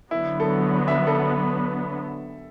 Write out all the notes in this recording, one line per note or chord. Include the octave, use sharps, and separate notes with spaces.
D3 F#3 B3 E4
A4
E5
A4